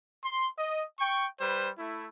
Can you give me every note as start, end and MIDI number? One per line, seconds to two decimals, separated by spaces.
0.24 0.47 84
0.58 0.84 75
1.00 1.26 79
1.00 1.26 85
1.40 1.70 55
1.40 1.70 71
1.40 1.70 72
1.77 2.07 57
1.77 2.07 64